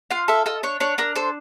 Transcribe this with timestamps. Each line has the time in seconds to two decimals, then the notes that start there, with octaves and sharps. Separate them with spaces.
0.11 F4 F5
0.28 A4 E5
0.46 A4 D#5
0.63 D4 C#5
0.80 D4 C#5
0.98 D4 A#4
1.16 A4 C5